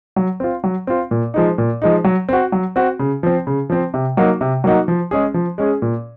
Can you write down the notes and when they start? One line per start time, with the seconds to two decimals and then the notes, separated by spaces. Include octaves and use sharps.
0.16 F#3
0.40 C4 F4
0.64 F#3
0.87 C4 F4
1.11 A#2
1.34 F3 G#3 D#4
1.58 A#2
1.82 F3 G#3 D#4
2.04 F#3
2.29 C4 F#4
2.52 F#3
2.76 C4 F#4
2.99 C#3
3.23 F3 C4
3.47 C#3
3.70 F3 C4
3.94 C3
4.17 F#3 A#3 D#4 F#4
4.41 C3
4.64 F#3 A#3 D#4 F#4
4.88 F3
5.11 G#3 C#4 G#4
5.34 F3
5.58 G#3 C#4 G#4
5.82 A#2